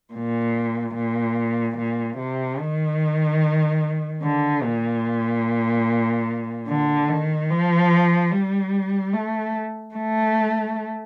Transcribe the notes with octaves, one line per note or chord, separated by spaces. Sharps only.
A#2
A#2
A#2
C3
D#3
D3
A#2
D3
D#3
F3
G3
A3
A3